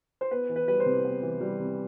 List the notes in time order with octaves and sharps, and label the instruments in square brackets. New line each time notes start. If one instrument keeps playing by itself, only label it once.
[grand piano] C5
B3 B4
E3
B4
G3 B4
C5
C3
B3
E3
G3
C3